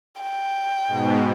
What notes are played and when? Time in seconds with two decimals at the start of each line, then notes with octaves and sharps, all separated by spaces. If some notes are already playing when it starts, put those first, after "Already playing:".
0.21 G5
0.88 G#2 B2